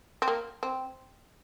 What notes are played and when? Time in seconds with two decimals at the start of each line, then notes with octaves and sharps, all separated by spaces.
0.22 C4
0.28 A#3
0.63 C4